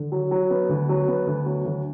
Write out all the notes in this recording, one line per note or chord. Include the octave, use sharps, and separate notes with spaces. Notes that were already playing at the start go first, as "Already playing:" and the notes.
Already playing: D3
F#3
F#3
B3
D2
F#3
B3
D2
F#3
D2